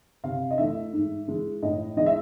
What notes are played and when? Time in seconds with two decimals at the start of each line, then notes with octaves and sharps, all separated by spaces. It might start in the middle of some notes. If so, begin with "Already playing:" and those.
0.24 C3 F5
0.51 D#5
0.58 E3 A3 E5
0.93 G#2
1.28 E3 G#3
1.62 A2 D#5
1.97 E3 G#3 D#5
2.06 E5